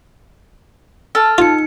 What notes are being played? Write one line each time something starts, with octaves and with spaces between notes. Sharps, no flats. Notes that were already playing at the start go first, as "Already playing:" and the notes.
A4 A5 F6
D#4 F4 C#7